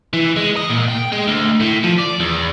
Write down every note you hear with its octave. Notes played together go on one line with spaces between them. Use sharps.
E3
G#3
D#5
A#2
G5
G#3
D2
A2
F3
D5
E2